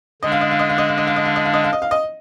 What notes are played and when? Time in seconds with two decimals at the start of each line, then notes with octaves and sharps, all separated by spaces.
0.22 D3 G#3 D4 D#5
0.32 F5
0.41 D#5
0.51 F5
0.59 D#5
0.69 F5
0.78 D#5
0.88 F5
0.98 D#5
1.07 F5
1.16 D#5
1.25 F5
1.36 D#5
1.45 F5
1.54 D#5
1.64 F5
1.73 D#5
1.82 F5
1.91 D#5